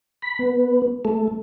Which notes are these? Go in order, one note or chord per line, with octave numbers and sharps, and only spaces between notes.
B5
B3
A3